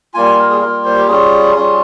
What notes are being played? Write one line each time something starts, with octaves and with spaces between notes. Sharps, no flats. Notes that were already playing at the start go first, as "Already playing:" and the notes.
G3 A#3 F4 G#5
G#5
A#4
G#4
G3 A#3 F4 A#4
C5
G4
G3 C#4 F4 G#4
G3 C#4 F4